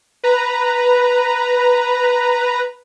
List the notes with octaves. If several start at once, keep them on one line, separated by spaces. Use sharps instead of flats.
B4 A#5